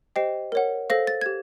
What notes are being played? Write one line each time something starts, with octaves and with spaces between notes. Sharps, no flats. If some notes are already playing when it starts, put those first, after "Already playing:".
G4 C5 D#5 G5 C7
A#4 C#5 F#5
A4 C5 F5 A#6
A6
G4 G#6